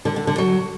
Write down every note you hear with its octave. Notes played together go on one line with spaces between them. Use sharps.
D3
D3
D3
F#3